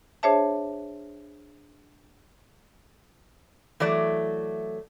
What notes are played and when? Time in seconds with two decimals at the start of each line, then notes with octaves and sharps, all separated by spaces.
0.23 D4 G#4 C5 C#5 E5 A5
3.80 E3 F#3 A3 D5